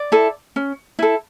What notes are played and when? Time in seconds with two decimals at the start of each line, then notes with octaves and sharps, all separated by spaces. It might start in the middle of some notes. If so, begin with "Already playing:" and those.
Already playing: D5
0.12 E4 A4
0.56 C#4
0.99 E4 A4